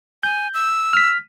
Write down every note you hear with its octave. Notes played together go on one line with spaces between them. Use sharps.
G#5 G6
E6
F6 B6